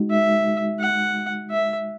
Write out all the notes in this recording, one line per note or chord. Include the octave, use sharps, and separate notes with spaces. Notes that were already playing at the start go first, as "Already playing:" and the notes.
Already playing: G#3 D#4 F#4
E5
F#5
E5